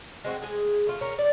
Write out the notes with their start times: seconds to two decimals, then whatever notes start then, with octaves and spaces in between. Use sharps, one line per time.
0.24 G#3 C4 F#4
0.42 G#3 G#4
0.87 A3 F4
1.01 C#4 A#4
1.19 D5